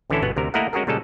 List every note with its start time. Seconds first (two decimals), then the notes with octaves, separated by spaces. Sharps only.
0.10 A1 D3 E3 C#4 E4 A4
0.22 G1 B2 B3 F#5
0.37 D2 C3 A#4
0.54 A3 A#3 E4 A#4 D#5 F#5
0.73 G#3 C#4 F#4 G#4 A#4
0.87 A#2 C#3 G3 G#3 A4